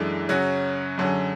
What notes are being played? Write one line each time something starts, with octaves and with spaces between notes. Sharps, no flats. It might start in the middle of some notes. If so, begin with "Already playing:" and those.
Already playing: F#2 E3 G#3 D4 A4
F#2 C#3 F#3 C#4 F#4
F#2 D3 F#3 C#4 G#4